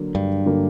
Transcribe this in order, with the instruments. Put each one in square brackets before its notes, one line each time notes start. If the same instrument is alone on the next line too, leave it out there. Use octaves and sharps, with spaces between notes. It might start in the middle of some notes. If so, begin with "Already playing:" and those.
Already playing: [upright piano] D3 F#3 A#3
[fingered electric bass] G2
[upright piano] D3 F#3 A#3